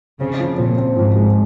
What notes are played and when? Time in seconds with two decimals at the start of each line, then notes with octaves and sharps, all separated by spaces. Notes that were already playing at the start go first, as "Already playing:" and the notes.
0.20 C#3 C4
0.40 F3
0.58 A#2 C4
0.78 C4
0.96 G#2 F3
1.15 G#3